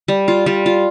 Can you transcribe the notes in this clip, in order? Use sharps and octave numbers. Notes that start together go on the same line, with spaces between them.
G3
F4
G3
F4